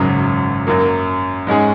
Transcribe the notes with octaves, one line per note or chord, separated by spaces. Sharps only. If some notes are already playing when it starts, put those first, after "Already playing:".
Already playing: G#1 F#2 C#3 F#3
F#2 F#3 A#3
G#2 G#3 C#4 G#4